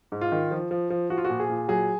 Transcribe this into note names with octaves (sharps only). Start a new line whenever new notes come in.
G#2
F4
D#3
F3
F3
F3
F3 F#4
F4
F#4
A#2
G#4
A#2
F#3 G#4